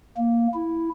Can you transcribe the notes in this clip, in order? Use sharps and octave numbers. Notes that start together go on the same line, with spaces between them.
A#3
E4